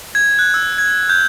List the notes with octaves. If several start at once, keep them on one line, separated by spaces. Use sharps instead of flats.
G#6
F#6
E6
G#6
G6